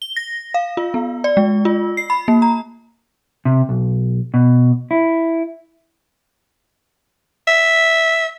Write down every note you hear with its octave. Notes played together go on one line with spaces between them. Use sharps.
G7
A#6
F5
F4
B3
D5
G#3
F4
C7
B5
A#3
A#5
C3
B1
B2
E4
E5